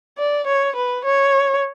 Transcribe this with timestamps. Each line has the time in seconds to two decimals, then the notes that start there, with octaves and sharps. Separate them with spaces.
0.19 D5
0.47 C#5
0.76 B4
1.05 C#5